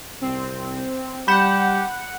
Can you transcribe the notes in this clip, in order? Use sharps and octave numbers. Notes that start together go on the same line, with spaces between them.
C2 C4
G3 G4 F#5 B5 G6 E7